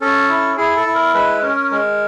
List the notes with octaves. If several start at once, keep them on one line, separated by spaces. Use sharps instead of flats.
C#4 A4
E4
E4 G#4
A4
E4
A#4
G#3 B4
C#4 A#4
G#3 A#4